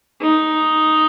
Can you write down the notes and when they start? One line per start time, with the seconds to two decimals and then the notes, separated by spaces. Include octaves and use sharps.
0.21 D#4